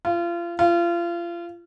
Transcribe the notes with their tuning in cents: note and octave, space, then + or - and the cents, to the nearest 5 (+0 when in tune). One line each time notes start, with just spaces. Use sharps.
F4 -30
F4 -30